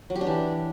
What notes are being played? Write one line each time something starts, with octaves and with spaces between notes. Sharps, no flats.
F#3
G4
D4
E3